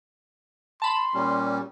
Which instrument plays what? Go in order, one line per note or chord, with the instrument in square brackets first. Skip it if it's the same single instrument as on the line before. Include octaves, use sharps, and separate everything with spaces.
[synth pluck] A5 B5 [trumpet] C6
[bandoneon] A#2 G3 C#4